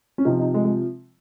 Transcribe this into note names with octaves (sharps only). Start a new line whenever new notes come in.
C#4
C3 F3 D#4
D#4
G#3
G#3